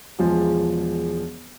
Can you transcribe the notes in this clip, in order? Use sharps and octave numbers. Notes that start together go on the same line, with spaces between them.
E1 F3 G#3 G#4